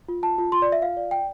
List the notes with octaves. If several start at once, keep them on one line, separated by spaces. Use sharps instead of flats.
F4
F4 A5
F4
F4 C6
D5
F4
E5
F4 F5
D5
D5 G5